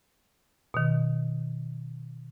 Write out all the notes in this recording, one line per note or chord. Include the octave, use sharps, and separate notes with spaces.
B2 D#3